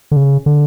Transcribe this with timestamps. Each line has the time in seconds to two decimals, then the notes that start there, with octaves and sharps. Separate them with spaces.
0.11 D3
0.16 C#3
0.46 D3